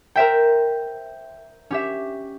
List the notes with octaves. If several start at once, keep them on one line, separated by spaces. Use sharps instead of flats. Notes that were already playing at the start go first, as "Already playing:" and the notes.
A#4 C5 E5 G5
C#4 G4 E5